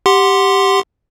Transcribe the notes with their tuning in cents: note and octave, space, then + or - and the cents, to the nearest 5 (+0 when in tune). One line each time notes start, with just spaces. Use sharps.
G4 +0 F#5 +0 C6 +0